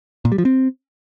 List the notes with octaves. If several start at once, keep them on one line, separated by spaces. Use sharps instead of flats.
A#2
G3
F3
C4